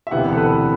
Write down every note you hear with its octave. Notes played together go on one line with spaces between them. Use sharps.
E5
E1 D2 C3 E3 B3 F#5
A4
B4